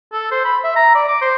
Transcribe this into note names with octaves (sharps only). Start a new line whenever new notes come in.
A4
C5
B5
E5
A#5
D5
D6
C5